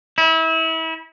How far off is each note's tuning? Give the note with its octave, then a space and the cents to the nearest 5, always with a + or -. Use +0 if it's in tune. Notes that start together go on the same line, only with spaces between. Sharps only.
E4 -30